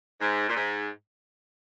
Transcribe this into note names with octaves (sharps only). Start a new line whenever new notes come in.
G#2
A#2
G#2